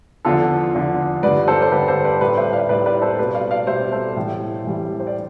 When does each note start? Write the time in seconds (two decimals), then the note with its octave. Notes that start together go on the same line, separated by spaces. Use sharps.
0.25 E2 D3 F3 F4 A4
0.74 E2 D3 F3
1.23 G2 D3 G3 B4 D5
1.48 A4 C5
1.62 C5
1.71 G2 D3 G3 G4 B4
1.88 A4 C5
2.04 B4 D5
2.20 A2 G3 B4 D5
2.37 C5 E5
2.53 D5 F5
2.69 A2 G3 B4 D5
2.86 B4 D5
3.02 A4 C5
3.18 B2 G3 B4 D5
3.35 D5 F5
3.51 D5 F5
3.67 B2 G3 C5 E5
3.92 A4 C5
4.16 A2 E3 G3
4.65 A2 E3 G3
5.00 C5
5.07 D5